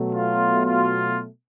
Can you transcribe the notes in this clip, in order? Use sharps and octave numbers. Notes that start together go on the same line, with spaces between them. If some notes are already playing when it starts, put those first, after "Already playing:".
Already playing: B2 F#3 A3
F4
F4